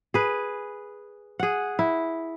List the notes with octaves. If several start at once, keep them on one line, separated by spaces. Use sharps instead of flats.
G#4 B4
G#4 F#5
E4